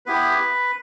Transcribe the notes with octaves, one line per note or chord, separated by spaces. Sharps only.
B3 E4 G4 B4